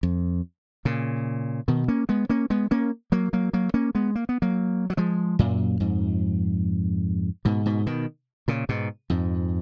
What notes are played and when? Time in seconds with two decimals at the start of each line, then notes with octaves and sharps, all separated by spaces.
0.03 F2
0.85 A#2 C#3
1.68 B2 D#3
1.88 A#3 C#4
2.09 G#3 B3
2.30 A#3 C#4
2.50 G#3 B3
2.71 A#3 C#4
3.12 F#3 A#3
3.33 F#3 A#3
3.53 F#3 A#3
3.74 A#3 C#4
3.95 G#3 B3
4.15 A#3
4.29 B3
4.42 F#3 A#3
4.90 F#3
4.97 F3 G#3
5.39 F#2 A#2
5.80 F2 G#2
7.45 G#2 B2
7.66 G#2 B2
7.86 B2 D#3
8.48 A#2 C#3
8.69 G#2 B2
9.10 F2 G#2